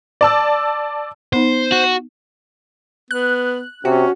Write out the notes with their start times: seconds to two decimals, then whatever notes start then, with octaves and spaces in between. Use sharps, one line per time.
0.21 D5 A5 E6
1.33 B3 D#4 C5
1.72 F#4
3.11 B3 F#6
3.85 C3 C#4 F#4